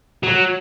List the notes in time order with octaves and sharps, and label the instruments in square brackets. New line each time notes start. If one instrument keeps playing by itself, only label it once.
[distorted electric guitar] F#3